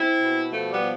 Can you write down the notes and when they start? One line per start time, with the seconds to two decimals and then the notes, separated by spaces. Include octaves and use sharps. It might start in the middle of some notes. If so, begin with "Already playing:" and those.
Already playing: C4 E4
0.21 B2
0.51 F3 A3
0.71 G3 B3
0.80 F3